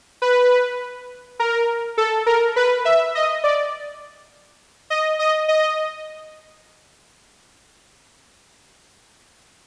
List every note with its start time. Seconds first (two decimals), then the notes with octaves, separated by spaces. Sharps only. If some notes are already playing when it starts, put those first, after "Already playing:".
0.22 B4
1.40 A#4
1.98 A4
2.26 A#4
2.56 B4
2.85 E5
3.15 D#5
3.44 D5
4.90 D#5
5.19 D#5
5.48 D#5